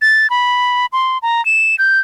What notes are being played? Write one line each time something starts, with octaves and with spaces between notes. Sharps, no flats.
A6
B5
C6
A#5
E7
G6